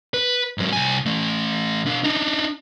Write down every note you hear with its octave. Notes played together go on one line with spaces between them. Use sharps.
B4
G#2 F#3
C2 G#5
E3 A3
B2 D4
D4 D#4